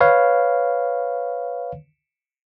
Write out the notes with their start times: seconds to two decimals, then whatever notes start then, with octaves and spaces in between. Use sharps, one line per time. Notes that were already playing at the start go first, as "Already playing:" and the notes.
0.01 B4 C#5 F5